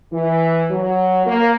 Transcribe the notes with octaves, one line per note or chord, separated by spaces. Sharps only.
E3
F#3
A#3